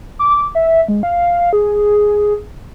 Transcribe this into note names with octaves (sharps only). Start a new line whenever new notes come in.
D6
E5
G#3
F5
G#4